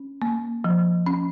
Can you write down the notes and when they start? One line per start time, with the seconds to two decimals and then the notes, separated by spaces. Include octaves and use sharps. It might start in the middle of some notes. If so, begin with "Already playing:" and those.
Already playing: C#4
0.22 A#3
0.64 F3
1.06 C#4